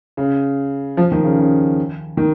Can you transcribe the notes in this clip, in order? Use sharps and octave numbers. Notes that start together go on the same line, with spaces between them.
C#3
F3
D#3
C#3
C#3
D#3